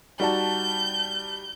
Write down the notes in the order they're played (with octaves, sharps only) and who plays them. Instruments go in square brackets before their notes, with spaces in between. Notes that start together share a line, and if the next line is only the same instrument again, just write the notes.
[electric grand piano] G3 A5 [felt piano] D#4 F#4 D5 [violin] G6